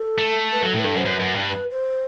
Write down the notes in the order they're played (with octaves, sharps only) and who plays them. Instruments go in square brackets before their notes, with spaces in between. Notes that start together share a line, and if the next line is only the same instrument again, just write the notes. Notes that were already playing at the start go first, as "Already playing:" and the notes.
Already playing: [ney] A4
[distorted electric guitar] A3
[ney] B4
[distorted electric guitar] F#3 [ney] A4
[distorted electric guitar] A2
[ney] B4
[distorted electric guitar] G2 [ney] A4
[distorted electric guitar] F#2
[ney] C5
[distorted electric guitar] F#2 [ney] B4
[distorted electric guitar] F#2
G2
[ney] B4
C5